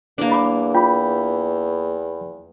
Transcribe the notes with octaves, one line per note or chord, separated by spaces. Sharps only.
E2 A#3 D4
D#5 B5 D6
F4 G5 B5